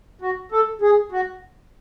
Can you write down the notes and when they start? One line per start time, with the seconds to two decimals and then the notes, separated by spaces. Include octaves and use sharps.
0.21 F#4
0.52 A4
0.81 G#4
1.12 F#4